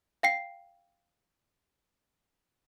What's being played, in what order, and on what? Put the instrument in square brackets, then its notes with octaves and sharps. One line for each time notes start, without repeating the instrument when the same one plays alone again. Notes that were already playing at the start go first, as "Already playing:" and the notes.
[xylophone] F5 G5 C7